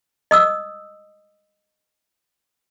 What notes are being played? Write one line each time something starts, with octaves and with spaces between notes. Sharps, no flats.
D#5 D#6 E6